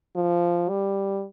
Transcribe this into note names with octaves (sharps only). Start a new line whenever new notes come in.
F3
G3